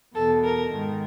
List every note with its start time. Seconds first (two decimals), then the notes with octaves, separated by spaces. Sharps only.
0.15 E2 B2 A4
0.43 A#4
0.71 G#2 D#3